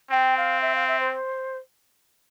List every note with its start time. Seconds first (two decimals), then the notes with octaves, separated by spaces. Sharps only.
0.11 C4 G5
0.37 F5
0.61 E5
0.75 F5
0.87 E5
1.00 C5